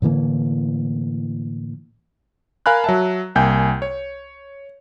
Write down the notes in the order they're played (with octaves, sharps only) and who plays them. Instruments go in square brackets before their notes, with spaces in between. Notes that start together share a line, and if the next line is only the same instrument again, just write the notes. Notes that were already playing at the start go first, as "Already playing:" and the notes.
[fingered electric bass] A2 D3 E3 A#3
[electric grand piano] A#4 F5 G#5 B5 F#6
F#3 E5 A5
C2 A#3 G5 G#5 G6
C#5